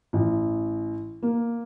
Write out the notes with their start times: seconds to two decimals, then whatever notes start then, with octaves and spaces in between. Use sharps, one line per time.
0.13 A1
1.23 A#3